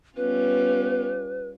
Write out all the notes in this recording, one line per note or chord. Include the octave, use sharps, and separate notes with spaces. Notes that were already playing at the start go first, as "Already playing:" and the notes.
G3 B3 C#4 F4 B4